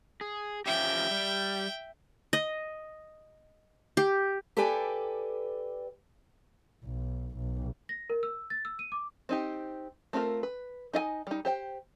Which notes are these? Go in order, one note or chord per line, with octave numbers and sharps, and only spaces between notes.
G#4
F3 C#4 G4 E5 G5
G3
D#5
G4
G4 A4 B4 D5 G5 G#5
B1
B1
A#6
A#4
E6
A6
E6
D#7
D6
C4 D#4 G4
A3 C4 F4 G#4 A#4
B4
D#4 D#5 F5 G#5
G3 D#4
G4 C5 G5